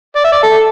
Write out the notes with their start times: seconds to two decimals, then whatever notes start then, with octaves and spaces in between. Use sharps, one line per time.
0.16 D5
0.24 E5
0.32 D5
0.43 A4